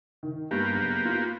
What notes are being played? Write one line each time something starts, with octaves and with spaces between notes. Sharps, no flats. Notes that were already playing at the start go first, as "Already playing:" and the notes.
D#3
G2 A#3 B3 G4
F#1
F4